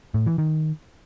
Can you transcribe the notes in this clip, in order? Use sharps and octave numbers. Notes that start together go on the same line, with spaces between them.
A2
E3
D#3